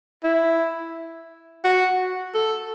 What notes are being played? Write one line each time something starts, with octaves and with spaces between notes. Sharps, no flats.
E4
F#4
A4